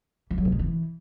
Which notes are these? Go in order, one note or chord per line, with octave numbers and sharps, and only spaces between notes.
E3
F#3
A#2
G#2
E3